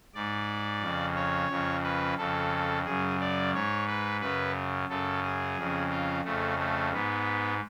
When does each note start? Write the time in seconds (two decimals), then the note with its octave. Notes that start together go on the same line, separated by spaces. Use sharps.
0.14 G#2 D5
0.82 F2 C#3
1.16 C#5
1.50 F2 C#3
1.84 B4
2.18 F2 C#3 A4
2.85 F#2 C#3 G#4
3.20 D5
3.53 G#2 C#5
3.88 B4
4.21 F#2 C#3 B4
4.89 F#2 C#3 A4
5.23 G#4
5.57 F2 C#3
5.91 F4
6.24 F2 C#3 A3
6.59 A3
6.92 G#2 B3